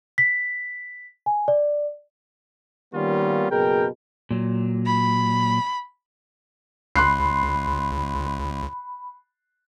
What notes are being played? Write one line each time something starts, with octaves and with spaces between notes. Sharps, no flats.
B6
G#5
D5
D#3 G3 A#3 B3 C#4 F4
F#1 B2 G#4 A#4 G5
A#2 F#3
B5
C#2 B5 C6 F#6 C7